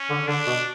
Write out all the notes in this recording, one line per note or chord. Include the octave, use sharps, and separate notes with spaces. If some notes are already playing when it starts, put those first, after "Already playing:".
Already playing: C#4
D3
D3 D4
B2